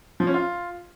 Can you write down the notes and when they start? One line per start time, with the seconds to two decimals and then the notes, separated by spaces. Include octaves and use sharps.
0.20 F3
0.27 C#4
0.34 F4